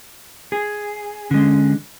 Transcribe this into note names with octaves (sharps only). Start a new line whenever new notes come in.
G#4
D3 G#3 C#4